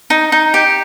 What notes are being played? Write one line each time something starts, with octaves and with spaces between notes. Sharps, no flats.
D#4
D#4
G4